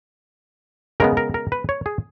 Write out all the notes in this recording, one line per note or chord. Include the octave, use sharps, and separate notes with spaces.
C#3 G#3 B3 A#4
A#4
A#4
B4
C#5
G#4